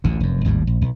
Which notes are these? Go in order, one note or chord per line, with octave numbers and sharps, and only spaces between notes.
A1 D2 D3
F1 F#2
G#1 D#2 A2 G3
A#1
B1